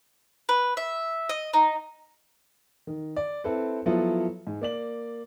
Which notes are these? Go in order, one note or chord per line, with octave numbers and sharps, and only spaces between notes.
B4
E5
D#5
D#4
D#3
D5
C4 E4 A4 B4
F3 F#3 B3 E4 F4 A4
G#2
A#3 D5 F#7